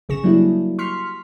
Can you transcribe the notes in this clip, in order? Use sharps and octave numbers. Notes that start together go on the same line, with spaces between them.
G1 C#3 G#4 C#6 A#6 E7
F#3 G3 A#3 D4 E4
C6 C#6 F6 B6 C#7